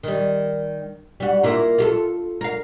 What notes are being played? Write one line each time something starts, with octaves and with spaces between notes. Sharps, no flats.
D#3 G3
G3 F#4
A#3 E4 F4
F4 G4 A4
A#4 F5